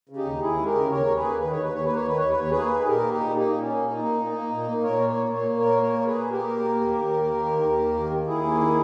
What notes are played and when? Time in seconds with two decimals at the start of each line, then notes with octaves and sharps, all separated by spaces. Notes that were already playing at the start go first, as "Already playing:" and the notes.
0.09 C#3
0.16 D#4 G4
0.25 D#2
0.41 D#2 E4 G#4
0.58 G#3
0.66 G4 A#4
0.75 C#3
0.90 D#2 A#4 C#5
1.07 D#2
1.15 G#4 B4
1.24 A#3
1.40 D#3 B4
1.51 C#5
1.56 D#2
1.62 B4
1.73 D#2 C#5
1.84 B4
1.89 A#3
1.96 C#5
2.05 D#3 B4
2.18 D#2 C#5
2.29 B4
2.38 D#2 C#5
2.51 A#3 G#4 B4
2.71 D#3
2.80 G#4
2.87 A#2 G4 A#4
3.04 A#3
3.12 D#4 G4
3.20 A#2
3.36 A#3 D#4
3.53 A#2
3.61 C#4
3.69 A#3
3.85 A#2 D#4
4.02 A#3
4.18 A#2
4.35 A#3
4.51 A#2
4.67 A#3
4.83 A#2 A#4 C#5
5.00 A#3
5.09 C#5
5.16 A#2
5.32 A#3 C#5
5.49 A#2
5.59 A#4 C#5
5.65 A#3
5.82 A#2 A#4 C#5
5.98 A#3
6.06 G#4 B4
6.15 A#2
6.31 A#3 G4 A#4
6.47 A#2
6.64 A#3
6.81 D#2
6.97 D#2
7.13 A#3
7.29 D#3
7.46 D#2
7.62 D#2
7.78 A#3
7.95 D#3
8.11 D#2
8.27 D#2 E4 G#4
8.44 A#3
8.61 D#3